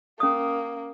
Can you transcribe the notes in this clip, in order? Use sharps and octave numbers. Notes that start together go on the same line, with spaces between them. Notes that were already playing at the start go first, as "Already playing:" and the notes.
A#3 C#4 D#6